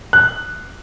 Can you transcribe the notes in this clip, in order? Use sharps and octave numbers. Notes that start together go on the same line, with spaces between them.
F#6